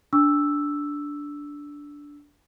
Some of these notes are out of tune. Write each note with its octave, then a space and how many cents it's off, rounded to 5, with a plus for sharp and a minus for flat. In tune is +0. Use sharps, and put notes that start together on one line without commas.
D4 -10 C#6 +40 E6 +0